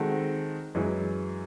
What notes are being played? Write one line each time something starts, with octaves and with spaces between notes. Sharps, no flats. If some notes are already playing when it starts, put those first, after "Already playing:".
Already playing: D#3 G#3 C4 F#4 A4
F#2 E3 G#3